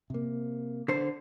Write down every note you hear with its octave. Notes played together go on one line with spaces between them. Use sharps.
C3 A#3
D3 C5